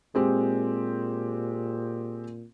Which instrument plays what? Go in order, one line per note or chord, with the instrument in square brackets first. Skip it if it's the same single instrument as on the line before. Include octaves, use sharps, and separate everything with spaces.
[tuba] A#2 [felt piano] G#3 C4 G4